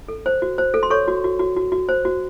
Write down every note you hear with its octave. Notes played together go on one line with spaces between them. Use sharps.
A4
C5
F#4
C5
A4
C6
A4 C#5 C#6
F#4
F#4
F#4
F#4
F#4
C5
F#4